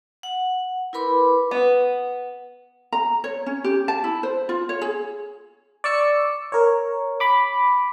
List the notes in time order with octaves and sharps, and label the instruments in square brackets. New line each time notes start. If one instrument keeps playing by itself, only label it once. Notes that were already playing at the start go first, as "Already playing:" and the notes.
[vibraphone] F#5
E4 A#4 B4 B5 C6 D6
[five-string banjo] B3
[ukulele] A#5
C#5
C#4
G4
A5
E4
C5
F4
C#5
G#4
[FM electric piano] D5 C#6 E6 C#7
A#4 C#5
B5 D6